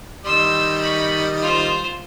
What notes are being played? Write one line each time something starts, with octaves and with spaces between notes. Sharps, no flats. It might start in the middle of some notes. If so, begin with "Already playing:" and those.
D#3 G3 D#5 C6 E6
B5 C#6
F4 C5